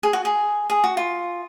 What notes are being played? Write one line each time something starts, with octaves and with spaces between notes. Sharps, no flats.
G#4
F#4
G#4
G#4
F#4
F4